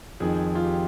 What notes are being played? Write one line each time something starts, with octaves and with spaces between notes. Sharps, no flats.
F2 D#3 G#4
F4
G4